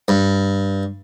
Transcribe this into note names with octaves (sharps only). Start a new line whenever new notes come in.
G2